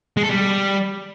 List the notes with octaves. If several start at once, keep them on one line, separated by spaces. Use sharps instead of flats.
G#3
A4
G3